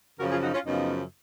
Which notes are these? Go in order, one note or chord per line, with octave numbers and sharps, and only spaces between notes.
F#2 C#3 F3 F#4 A#4
F4 G#4
D#4 F#4
C#4 F4
F#2 C#3 F3 B3 D#4